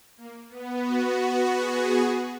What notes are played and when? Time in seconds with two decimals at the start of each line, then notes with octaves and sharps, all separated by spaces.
0.17 A#3
0.49 B3
0.79 F#4
1.09 F#4
1.55 G#4
2.00 B4